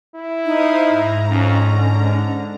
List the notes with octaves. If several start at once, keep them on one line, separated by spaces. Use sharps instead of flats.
E4
D#4 C5 F5 D#6
G#2 A#5
F2 C#4
D3